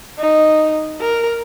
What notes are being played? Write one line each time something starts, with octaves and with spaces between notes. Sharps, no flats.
D#4
A#4